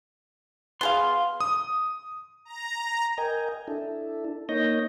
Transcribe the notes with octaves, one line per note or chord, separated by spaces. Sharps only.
B3 G#4 F5 C6
D#6
A#5
A#4 D#5 G5 G#5
D4 E4 A4
A#3 D#4 C#5 D#5 G6 A#6